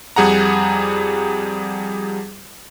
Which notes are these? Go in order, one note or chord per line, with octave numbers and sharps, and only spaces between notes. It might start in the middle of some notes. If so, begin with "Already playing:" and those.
F2 G3 G#4 F#5 A#5